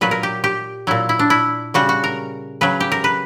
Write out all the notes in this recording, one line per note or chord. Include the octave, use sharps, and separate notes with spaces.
A#2 F#3 B4
A#4
G4
G4
A#2 F#3 E4
E4
D4
E4
C#3 G3 F#4
F#4
A#4
C#3 F#3 B4
G4
A#4
B4